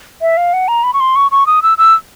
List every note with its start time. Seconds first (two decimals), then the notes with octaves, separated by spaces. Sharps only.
0.21 E5
0.37 F5
0.53 F#5
0.68 A#5
0.84 B5
0.94 C#6
1.00 C6
1.16 C#6
1.31 C#6
1.47 D#6
1.63 E6
1.78 E6